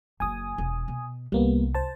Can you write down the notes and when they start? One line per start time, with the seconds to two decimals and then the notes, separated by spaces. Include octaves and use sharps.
0.20 F#1 F#2 G#5 D#6
0.58 E1
0.88 B2
1.32 C2 G3 A#3 B3
1.75 C5 A5